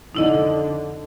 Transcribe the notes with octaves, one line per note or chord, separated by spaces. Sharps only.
F2 D3 D#4 E4 D#5